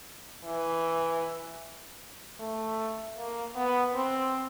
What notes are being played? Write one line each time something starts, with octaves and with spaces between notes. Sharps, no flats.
E3
A3
A#3
B3
C4